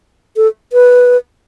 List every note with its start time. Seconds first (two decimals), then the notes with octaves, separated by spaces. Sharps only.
0.36 A4
0.73 B4